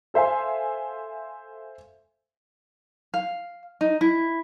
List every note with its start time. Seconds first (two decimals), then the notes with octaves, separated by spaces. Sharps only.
0.14 A4 C5 E5 F5 G#5
3.14 F5
3.81 D#4
4.01 E4